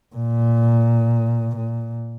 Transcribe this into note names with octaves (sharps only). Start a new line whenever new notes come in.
A#2
A#2